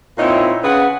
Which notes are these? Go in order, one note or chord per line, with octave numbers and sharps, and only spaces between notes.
A#2 C4 D#4 E4 C#5 E5
C#3 C#4 G#4 B4 F#5